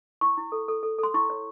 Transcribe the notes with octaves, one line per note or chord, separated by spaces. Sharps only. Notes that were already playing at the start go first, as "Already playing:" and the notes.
E4 C#6
E4
A4
A4
A4
A4 C6
E4 C#6
C#5